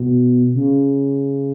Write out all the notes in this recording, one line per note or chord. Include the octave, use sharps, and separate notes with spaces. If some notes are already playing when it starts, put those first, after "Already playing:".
Already playing: B2
C#3